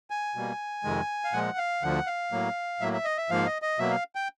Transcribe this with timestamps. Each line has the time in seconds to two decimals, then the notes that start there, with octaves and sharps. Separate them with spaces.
0.10 G#5
0.35 B2 G3 A#3
0.84 F2 C3 D#3 G#3
1.24 F5
1.33 A#2 F3 G#3 F#5
1.58 F5
1.82 D2 D3 F3 F#5
2.07 F5
2.32 A2 F#3 A#3
2.80 A2 F#3 A#3 E5
2.93 E5
3.05 D#5
3.18 E5
3.30 G#2 F3 A#3 F5
3.46 D#5
3.62 D#5
3.79 B2 F#3 A#3 E5
3.91 F5
4.15 G5